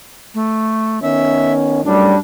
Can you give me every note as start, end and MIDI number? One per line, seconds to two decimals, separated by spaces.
0.34 0.99 57
1.02 1.79 51
1.02 1.79 59
1.02 1.79 61
1.02 1.52 76
1.84 2.14 42
1.84 2.14 45
1.84 2.16 55
1.84 2.19 62